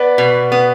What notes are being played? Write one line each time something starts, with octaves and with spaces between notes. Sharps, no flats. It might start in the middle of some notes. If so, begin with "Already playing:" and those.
Already playing: B3 B4 D5
B2
B3